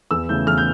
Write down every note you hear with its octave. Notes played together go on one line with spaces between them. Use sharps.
E2 E6
C#3 E3 A3 G6
E2 F6
G6